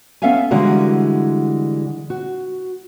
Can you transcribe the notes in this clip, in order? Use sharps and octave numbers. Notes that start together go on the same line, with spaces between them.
B3 C#4 A4 E5 F5 G#5
D3 E3 G3 G#3 F#4 A#4
F#4